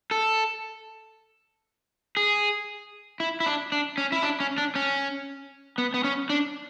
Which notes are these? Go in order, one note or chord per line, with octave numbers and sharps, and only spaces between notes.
A4
G#4
E4
E4
D4
D4
C#4
E4
D4
C#4
D4
C#4
B3
B3
C#4
D4